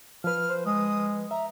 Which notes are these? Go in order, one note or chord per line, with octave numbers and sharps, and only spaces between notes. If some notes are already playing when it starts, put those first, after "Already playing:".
F3 B4 F6
C5
G#3 D#6
E5 A#5